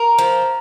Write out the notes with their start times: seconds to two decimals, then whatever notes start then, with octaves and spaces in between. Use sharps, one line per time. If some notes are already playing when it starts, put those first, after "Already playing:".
Already playing: A#4
0.18 F3